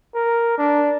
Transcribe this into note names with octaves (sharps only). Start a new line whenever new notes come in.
A#4
D4